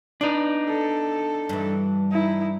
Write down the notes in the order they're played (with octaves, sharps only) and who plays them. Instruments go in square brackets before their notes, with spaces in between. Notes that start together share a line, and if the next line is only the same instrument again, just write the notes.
[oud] B3 D5 [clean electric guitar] D4 D#4
[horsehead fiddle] A4
[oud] G2 E3
[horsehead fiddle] D#4 E4